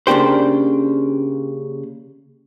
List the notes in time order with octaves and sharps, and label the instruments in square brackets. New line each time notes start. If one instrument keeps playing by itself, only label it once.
[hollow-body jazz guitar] C#3 A#3 D4 G4 C5